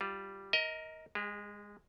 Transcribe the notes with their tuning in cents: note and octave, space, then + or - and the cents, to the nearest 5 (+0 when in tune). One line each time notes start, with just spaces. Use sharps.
G3 -5 F4 +0
A#4 +0 D#5 +25
G#3 -15 G4 +45